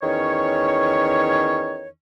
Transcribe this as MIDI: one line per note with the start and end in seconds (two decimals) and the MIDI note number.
0.02 1.87 40
0.02 1.87 51
0.02 1.87 61
0.02 1.87 73